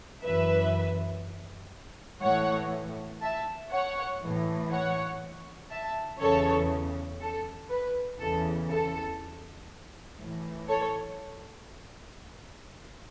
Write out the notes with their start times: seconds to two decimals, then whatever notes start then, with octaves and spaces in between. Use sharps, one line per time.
0.24 F#2 E3 B4 E5
2.22 A2 E3 C#5 F#5
3.22 E5 A5
3.71 C#5 F#5
4.21 A2 E3
4.71 C#5 F#5
5.71 E5 A5
6.20 E2 C#3 E3 A4 C#5
7.20 A4
7.70 B4
8.20 E2 C#3 E3 A4
8.69 A4
10.19 A2 E3
10.68 A4 C#5